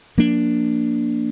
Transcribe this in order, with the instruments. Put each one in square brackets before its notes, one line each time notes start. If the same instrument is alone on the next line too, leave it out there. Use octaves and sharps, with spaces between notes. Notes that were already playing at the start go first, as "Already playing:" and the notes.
[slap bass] F3 A#3 D4